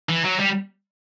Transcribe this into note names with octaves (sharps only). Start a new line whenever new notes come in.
E3
F#3
G3